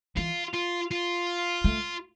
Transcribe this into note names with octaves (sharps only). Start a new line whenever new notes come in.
E3 F4
F4
F4
A3